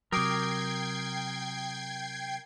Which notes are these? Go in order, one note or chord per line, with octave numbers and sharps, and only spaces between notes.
C3 F#3 A#4 G5 D6 D#6 G#6 C7